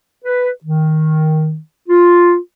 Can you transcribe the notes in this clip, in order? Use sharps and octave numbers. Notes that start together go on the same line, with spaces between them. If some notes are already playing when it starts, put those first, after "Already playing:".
B4
D#3
F4